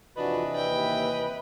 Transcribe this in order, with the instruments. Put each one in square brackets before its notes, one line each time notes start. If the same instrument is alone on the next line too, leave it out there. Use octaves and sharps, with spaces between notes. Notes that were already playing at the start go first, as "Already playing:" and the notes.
[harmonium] F2 F3 F#4 [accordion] C3 E3 D#5 [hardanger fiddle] D4 [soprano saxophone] B4
[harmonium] D#2 E5 [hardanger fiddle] G5